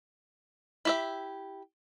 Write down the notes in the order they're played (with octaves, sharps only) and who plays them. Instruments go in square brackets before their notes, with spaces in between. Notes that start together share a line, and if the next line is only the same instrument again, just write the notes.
[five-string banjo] E4 G4 E5